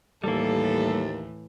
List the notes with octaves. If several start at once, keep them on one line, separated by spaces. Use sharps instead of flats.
D#2 A2 E3 G3 A#3 A4